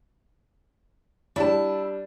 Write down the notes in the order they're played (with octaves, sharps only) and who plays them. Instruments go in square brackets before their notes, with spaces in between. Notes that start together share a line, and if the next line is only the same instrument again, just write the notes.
[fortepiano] G3 D4 [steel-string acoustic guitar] E4 A5